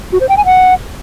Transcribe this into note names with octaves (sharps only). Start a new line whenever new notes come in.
F#4
C5
G5
G#5
F#5